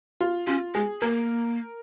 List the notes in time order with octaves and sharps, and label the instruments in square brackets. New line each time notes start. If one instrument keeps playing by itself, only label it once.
[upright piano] F4
[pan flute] C#4 [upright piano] F4
[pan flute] G#3 [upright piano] G#4
[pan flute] A#3 [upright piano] A#4